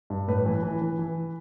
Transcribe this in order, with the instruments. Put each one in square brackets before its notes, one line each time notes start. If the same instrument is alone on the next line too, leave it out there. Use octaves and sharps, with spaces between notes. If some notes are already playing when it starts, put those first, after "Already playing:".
[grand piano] G2
A2 B4
E3
E3
E3
E3